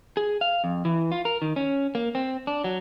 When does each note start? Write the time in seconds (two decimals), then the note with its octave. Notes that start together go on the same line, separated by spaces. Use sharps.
0.17 G#4
0.41 F5
0.64 F2
0.85 E3
1.12 F4
1.25 A#4
1.42 D#3
1.56 C#4
1.95 A#3
2.15 C4
2.47 D4
2.64 F#3